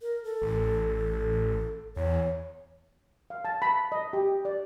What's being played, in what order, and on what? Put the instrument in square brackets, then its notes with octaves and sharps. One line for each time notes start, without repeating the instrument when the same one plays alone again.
[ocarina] A#4
A4
[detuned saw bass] A1
[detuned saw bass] E2 [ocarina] C#5
[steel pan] F5
A5
B5
D#5
G4
D5